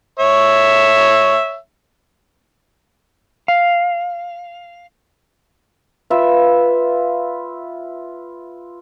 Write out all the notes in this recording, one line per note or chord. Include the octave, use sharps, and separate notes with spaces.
C#5 E5
F5
F4 B4 E5